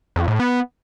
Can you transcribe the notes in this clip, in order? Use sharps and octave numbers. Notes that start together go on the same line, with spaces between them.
F2
A2
B3